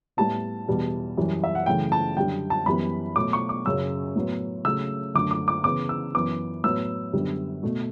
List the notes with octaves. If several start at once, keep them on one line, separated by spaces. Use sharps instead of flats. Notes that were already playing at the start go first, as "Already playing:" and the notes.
A2 G3 B3 A5
E2 B2 G3 B3
F#2 E3 G3
E5
F#5
F#2 C#3 E3 A3 G5
A5
F#2 D3 G3 G5
A5
F#2 E3 G3 B3 B5
B2 F#3 A3 D6
C#6
D6
F#2 C#3 F#3 E6
A2 F#3 B3
C#3 F#3 A3 E6
F#2 D3 A3 D6
D6
D6
C#3 E3 B3 D6
E6
F#2 E3 B3 D6
A2 F#3 B3 E6
F#2 D3 G3 B3
B2 A3